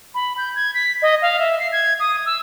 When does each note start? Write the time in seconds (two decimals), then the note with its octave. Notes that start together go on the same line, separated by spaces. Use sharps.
0.15 B5
0.38 G6
0.56 G#6
0.74 B6
1.02 D#5
1.22 F5
1.39 E5
1.60 C7
1.72 G#6
2.00 D#6
2.26 E6